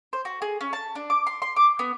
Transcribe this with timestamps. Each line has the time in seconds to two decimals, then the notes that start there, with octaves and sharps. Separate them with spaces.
0.13 C5
0.25 F#4
0.42 G#4
0.61 C#4
0.73 A5
0.95 D4
1.10 D6
1.27 C6
1.42 C6
1.56 D6
1.79 B3